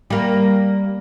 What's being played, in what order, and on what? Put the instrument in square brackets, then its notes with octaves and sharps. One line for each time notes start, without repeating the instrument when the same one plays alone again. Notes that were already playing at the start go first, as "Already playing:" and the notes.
[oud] G3 A#3